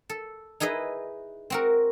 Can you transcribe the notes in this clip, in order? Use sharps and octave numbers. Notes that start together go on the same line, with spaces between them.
A4
D#4 E4 G#4 B4 D#5
C4 F#4 A#4